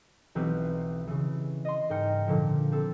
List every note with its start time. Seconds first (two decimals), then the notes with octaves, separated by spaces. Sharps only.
0.35 B1 E3 B3 C4 G4 B4
1.07 C#3 E3
1.65 D#5 C6
1.90 G#2 A#4 G5 F6 C#7
2.28 A#2 D3 F3
2.72 C4 A4